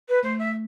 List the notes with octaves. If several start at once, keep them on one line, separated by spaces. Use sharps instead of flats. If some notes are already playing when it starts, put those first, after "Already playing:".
B4
A3 C5
E5